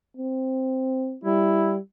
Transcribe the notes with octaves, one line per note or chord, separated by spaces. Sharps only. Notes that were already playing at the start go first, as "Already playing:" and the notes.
C4
G3 E4